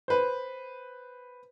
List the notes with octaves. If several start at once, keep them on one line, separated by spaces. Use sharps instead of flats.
B4 C5